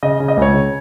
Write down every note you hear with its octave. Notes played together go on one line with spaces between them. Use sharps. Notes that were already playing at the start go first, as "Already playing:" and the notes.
C#3 D#5
C#3
D#5
C#2 C#5
C#3